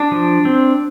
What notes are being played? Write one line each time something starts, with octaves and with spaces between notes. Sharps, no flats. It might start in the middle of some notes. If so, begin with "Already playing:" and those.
Already playing: D4
F3
C4